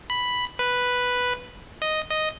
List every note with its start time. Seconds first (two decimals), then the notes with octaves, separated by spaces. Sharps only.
0.10 B5
0.59 B4
1.82 D#5
2.11 D#5